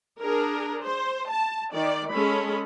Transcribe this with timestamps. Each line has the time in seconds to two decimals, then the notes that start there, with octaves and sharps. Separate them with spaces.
0.20 D4 G#4 A#4
0.83 C5
1.30 A5
1.72 D#3 D5
2.11 G#3 C#4 G#4 A4 B5